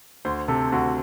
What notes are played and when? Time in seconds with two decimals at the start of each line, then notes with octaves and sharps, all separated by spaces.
0.25 D2 C5
0.48 C3 A4
0.72 D2 F#4